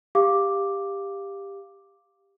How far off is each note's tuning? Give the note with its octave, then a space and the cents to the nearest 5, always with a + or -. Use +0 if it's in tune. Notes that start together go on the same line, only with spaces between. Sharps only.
G4 +15 F5 +0 D6 +0